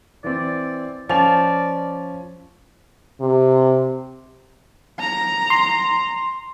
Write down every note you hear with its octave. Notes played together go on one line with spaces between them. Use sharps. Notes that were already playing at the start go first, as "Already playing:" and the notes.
E3 C4 D5
F3 C#4 D5 G#5 F7
C3
A#5
C6